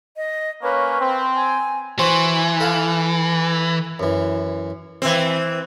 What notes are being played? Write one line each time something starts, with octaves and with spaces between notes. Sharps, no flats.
D#5
A#3 C#4 B4 C#5
C4
G#5
E3 F#4 C5
A4 F5 F#5
F#2 E3
E3 C4